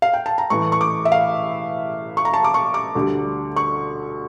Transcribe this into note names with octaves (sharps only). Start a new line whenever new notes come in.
F5
G5
A5
A#5
A2 E3 A3 C#6
C#6
D6
E5
F5
C#6
A#5
A5
D6
C#6
D6
D2 D3 G3
C#6